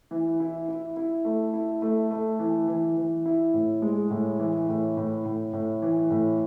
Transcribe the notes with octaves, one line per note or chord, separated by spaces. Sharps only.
E3
E4
E4
E4
A3
E4
A3
A3
E3
E3
E3
E4
A2
G#3
A2
E3
A2
A2
A2
A2
E3
A2